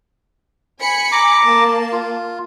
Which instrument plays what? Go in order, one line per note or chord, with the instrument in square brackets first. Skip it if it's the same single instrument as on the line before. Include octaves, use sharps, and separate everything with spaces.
[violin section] G#5 B5 C#7
[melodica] A#5 D6
[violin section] A#3 A5
[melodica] F4